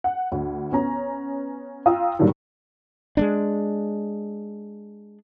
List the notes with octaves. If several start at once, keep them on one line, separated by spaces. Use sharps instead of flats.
F#5
D2
B3 C#4 A#5
F4 G5 A#5 D#6 E6
G2 A#2 D3 D#3 F#3
G#3 A#3 D4